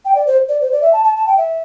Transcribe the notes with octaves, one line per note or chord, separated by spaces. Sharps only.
G5
D5
C5
D5
C5
D5
E5
A5
A5
A5
G5
E5